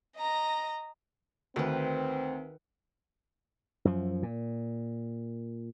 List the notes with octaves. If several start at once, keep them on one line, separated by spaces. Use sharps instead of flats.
D#5 A#5
D2 D#3 C4 B4
F#2 F3
A#2